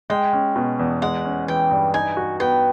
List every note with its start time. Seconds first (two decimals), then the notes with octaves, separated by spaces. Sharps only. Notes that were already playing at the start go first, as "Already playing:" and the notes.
0.10 G#3 G5
0.33 C#4
0.56 B2
0.79 E2
1.02 G#3 F#5
1.25 C#4
1.48 E3 G5
1.71 G2
1.94 D#4 G#5
2.17 F#4
2.40 B3 G5